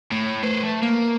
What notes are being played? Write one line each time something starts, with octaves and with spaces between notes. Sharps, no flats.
A2
B4 C5
A3
A#3